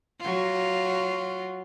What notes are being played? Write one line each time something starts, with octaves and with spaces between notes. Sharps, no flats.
F#3 F4